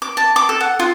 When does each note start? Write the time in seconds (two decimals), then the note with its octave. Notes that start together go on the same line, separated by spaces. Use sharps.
0.02 D6
0.17 A5
0.36 D6
0.49 A4
0.60 F#5
0.79 F4